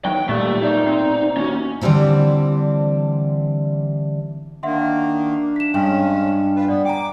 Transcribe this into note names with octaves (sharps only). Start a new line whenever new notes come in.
B1 E2 D#3 F#3 G5
D#2 A#2 G3 A3
B2 D#4 D5 E5
C4
D#2 C#4 F#4
D3 E3 G3 C4 D4
D#3 A#3 D4 E5 F#5 C6
B6 E7
G2 G#3 C#4
F4 B4
B3 D5
G5 G#5 A#5 D6